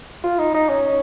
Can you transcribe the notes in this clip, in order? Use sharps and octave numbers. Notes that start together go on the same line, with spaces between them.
F4
D#4
D#4
C#4